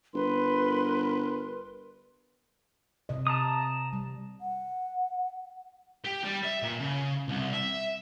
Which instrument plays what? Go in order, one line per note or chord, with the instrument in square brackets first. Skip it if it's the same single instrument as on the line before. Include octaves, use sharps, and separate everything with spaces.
[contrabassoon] G1 [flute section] A#4 B4 C6
[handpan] C3 D#5
[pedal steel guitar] A5 A#5 D#6
[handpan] G3
[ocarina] F#5
[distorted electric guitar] G4
G3
E5
A#2
C#3
C2
E5